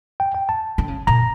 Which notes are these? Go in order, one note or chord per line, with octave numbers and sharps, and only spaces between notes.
G5
G5
A5
D3
C#3
A#2 A#5